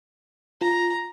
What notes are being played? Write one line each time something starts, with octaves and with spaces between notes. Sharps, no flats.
F4 A#5